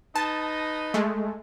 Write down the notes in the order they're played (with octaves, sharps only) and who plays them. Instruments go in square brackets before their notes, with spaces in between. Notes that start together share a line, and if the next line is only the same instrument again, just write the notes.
[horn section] D#4 B4 D#5 [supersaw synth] A5
[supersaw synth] G#3 A3